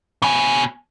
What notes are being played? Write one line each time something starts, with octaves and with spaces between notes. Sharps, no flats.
B2 G#5